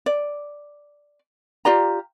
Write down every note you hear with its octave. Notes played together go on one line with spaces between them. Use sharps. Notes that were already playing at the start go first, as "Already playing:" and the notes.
D5
F4 G4 D5 A#5